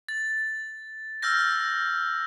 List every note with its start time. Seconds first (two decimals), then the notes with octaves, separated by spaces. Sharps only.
0.09 A6
1.22 E6 F6 G6 A#6